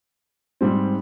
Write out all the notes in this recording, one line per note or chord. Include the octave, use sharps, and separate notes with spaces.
G#2 G3 C4